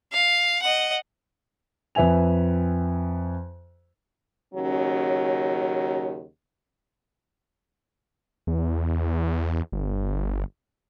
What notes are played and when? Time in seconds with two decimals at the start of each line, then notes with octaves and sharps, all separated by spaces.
0.13 F5
0.62 D#5 F#5
1.95 F2 B4 E5 G#5 F7
4.54 D#2 C#3 F#3 C#4
8.47 E2
9.72 G1